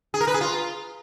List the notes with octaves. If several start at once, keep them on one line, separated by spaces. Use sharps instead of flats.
G#4
A#4
B4
G#4
F4